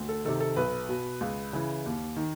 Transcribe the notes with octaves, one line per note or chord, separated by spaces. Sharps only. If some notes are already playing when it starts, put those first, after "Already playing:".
Already playing: D2
A4
C3 D#3 A4
A4
B1 B4
B2
C#2
C#3 E3
D#2
D#3